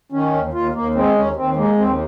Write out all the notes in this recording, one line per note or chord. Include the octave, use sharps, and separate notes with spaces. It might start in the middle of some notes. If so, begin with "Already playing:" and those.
D#3 C#4
D#2
D#2 F4
D#2 A#3
G#3 C4
D#2 C#4
D#2 C4
G#3 A#3
D#2 C4